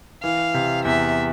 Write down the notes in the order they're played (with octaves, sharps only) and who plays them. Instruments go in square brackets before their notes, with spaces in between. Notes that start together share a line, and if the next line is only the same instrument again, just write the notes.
[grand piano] E3 [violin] F5
[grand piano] C3
[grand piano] E2 [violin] E5